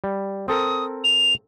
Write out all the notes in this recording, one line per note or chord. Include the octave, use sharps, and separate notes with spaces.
G3
C4 A4 A#4 D#6
F7